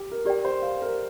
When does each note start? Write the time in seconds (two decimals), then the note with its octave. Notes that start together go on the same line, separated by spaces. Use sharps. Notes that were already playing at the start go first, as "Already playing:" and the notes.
Already playing: G4
0.12 A#4
0.25 G4 A#4 D5 G5
0.45 C5
0.62 F5
0.82 A#4